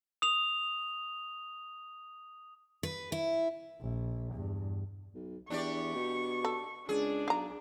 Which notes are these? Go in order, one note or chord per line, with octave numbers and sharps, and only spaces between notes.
D#6 F7
B4
E4
A#1
E2 G2
B1
E2 D4 G4 D5 C#6
B2
A4
C#2 D4 G#4
B1 F5 A#5